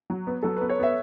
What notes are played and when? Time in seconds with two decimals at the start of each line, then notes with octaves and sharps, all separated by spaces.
0.10 F#3
0.27 B3
0.43 F#3 A4
0.56 B3 B4
0.69 C#5
0.79 B3 E5